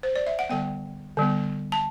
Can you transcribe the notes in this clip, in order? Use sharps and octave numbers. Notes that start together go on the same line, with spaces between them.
C5
D5
E5
F#5
D3 G3 B3 G5
D3 G3 B3
A5